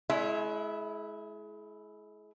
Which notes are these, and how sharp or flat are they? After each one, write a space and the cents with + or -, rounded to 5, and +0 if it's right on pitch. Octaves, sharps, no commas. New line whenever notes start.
G#3 +35 E4 +0 E5 +0